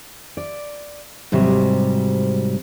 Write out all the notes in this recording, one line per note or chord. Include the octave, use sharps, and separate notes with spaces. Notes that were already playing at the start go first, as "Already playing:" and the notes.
D5
G#2 C3 F#3 G3